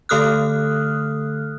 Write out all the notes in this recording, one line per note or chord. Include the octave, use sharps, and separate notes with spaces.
D3 A3 A4 D#6 F6 F#6